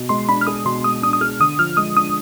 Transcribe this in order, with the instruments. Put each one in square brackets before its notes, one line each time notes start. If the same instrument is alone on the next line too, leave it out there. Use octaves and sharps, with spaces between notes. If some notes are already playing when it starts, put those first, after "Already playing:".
Already playing: [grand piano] B2
[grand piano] G#3 [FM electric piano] C6
[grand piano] D4 [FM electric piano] B5
[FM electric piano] F6
[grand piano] G#4 [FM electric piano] D#6
[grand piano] B2 [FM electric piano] C6
[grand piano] G#3 [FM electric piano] D#6
[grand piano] D4 [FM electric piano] D#6
[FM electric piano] D#6
[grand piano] G#4 [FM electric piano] F6
[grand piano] D3 [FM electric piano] D#6
[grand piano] F3 [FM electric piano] F6
[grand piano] G#3 [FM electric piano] D#6
[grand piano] D4 [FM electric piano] D#6